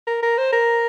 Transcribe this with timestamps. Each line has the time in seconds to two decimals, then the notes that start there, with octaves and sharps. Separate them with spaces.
0.07 A#4
0.23 A#4
0.38 C5
0.53 A#4